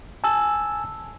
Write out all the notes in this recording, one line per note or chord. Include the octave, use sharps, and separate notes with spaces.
G#5 A5 E6